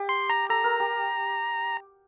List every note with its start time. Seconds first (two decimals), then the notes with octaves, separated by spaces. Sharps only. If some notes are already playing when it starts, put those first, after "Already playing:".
Already playing: G4
0.09 C6
0.30 A#5
0.49 A4 A#5
0.64 A#4
0.80 G4